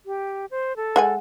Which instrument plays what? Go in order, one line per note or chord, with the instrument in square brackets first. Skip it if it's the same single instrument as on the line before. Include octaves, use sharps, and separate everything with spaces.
[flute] G4
C5
A4
[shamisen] G#3 F#5 G#5